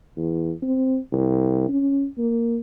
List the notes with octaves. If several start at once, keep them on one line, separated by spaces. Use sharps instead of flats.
E2
C4
C2
C#4
A#3